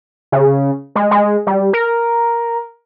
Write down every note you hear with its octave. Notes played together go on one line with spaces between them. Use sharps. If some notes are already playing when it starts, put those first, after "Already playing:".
C#3
G#3
G#3
G3
A#4